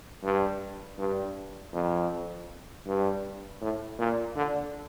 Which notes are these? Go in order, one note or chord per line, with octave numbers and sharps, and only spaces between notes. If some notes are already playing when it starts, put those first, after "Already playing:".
G2
G2
F2
G2
A2
A#2
D3